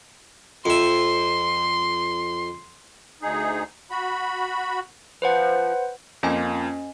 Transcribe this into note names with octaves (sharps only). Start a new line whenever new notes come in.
F2 E5 C6
D2 D#4 G#4
F#4 B5
F3 B4 C5 F#5
F2 A#3 C#4 F4 D#5 G#5